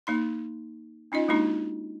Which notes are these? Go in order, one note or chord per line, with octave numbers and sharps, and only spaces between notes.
A#3 D#4 C6
C#4 D#4 F4 D#5
G#3 A#3 D4 D#4 F#4